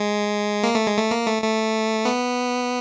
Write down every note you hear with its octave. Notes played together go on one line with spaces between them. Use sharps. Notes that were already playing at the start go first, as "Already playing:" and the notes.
Already playing: G#3
A#3
A3
G#3
A3
A#3
A3
A3
B3